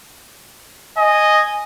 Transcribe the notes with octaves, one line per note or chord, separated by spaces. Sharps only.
D#5 G#5